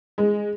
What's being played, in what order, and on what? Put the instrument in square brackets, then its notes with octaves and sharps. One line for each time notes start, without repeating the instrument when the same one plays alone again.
[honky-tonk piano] G#3